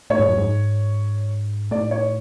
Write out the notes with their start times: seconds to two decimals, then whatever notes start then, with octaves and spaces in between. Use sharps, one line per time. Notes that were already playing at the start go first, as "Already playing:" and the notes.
0.10 A2 C#5
0.19 G#2
0.29 F#2
0.38 G#2
1.71 A2 D5
1.91 C#5